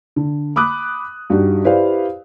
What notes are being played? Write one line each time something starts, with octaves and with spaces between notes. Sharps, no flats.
D3
B5 D6 D#6 F#6
G2 D#4 F#4 G4
E4 G4 B4 C5 D5 F5